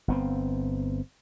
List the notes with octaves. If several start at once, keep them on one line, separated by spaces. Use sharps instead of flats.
G1 B3 C4